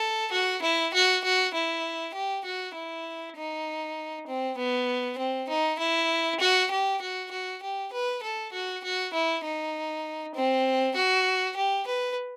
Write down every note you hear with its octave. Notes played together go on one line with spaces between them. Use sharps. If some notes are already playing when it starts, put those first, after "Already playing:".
Already playing: A4
F#4
E4
F#4
F#4
E4
G4
F#4
E4
D#4
C4
B3
C4
D#4
E4
F#4
G4
F#4
F#4
G4
B4
A4
F#4
F#4
E4
D#4
C4
F#4
G4
B4